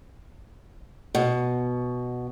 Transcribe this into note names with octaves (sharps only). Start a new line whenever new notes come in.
B2